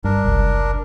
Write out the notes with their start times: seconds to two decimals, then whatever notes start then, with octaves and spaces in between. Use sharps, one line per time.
0.04 G2 D4 A#4
0.24 F#1 C2